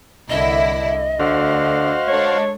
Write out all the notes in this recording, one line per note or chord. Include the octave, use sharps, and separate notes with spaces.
C2 D3 E4 D#5
D2 D3 F#4 C5 F5
G#3 D4 A4 C#5